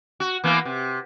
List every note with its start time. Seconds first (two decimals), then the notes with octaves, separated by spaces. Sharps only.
0.20 F#4
0.44 E3 A#3 B3
0.65 C3